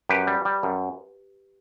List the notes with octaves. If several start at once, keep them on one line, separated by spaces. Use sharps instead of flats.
F#2 G4 B4
G3
G3
F#2